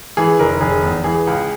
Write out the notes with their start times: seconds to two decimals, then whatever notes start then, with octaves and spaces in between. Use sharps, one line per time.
0.17 E3 G#4
0.39 F1 A#4
0.61 F1 G#4
0.83 E2
1.04 E3 G#4
1.27 C#2